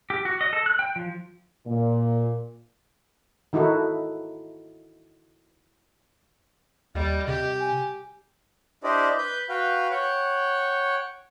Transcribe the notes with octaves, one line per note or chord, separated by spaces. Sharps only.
G4
F#4
D#5
A4
F#6
G5
F3
A#2
D#3 D#4 E4 F#4 A4
D#2 G3 D#5
C3 G4
G#5
D4 E4 G4 C5 D5 D#5
B4 B5 G6
F#4 B4 F5 G5
C#5 F#5 G5